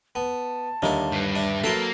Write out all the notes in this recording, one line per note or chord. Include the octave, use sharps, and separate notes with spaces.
B3 A5
D#2 D3 G3 D#4 E4 A#4
G2
D4 E5
F#3 A#3 A4 B4 A5 C6